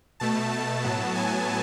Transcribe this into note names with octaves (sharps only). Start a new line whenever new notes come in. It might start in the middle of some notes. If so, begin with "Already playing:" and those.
B2 A3 A5
A5
A2 F#3 B3
G#5